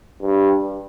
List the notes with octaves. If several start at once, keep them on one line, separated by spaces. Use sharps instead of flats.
G2